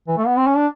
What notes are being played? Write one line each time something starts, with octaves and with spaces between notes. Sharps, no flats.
E3
A3
B3
C4
C#4
D4